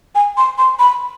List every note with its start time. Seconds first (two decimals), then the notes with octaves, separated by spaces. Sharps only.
0.15 G#5
0.37 C6
0.58 C6
0.79 B5